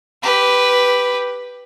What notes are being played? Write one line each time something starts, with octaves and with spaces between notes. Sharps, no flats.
G4 B4